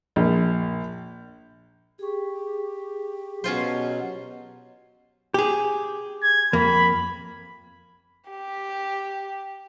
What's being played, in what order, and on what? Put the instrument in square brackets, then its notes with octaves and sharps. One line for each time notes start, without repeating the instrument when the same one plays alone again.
[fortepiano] A#1
[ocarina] G4 [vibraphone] G#4 C#6
[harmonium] B2 F#3 [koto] C#4 F4 C5
[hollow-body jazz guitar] G4 G#4
[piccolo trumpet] G#6
[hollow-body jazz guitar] F2 A#3 [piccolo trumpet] B5
[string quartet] G4